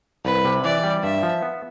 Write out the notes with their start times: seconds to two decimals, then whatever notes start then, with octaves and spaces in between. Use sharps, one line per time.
0.25 C2 B4
0.45 C3
0.64 E3 D5
0.84 G3
1.03 G2 E5
1.23 F3
1.42 B3